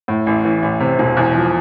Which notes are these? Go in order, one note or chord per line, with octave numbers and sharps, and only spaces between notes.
A2
A1
E3
A1
C3
E1
E2
F3